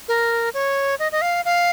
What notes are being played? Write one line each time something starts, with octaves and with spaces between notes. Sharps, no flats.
A#4
C#5
D#5
D#5
F5
F5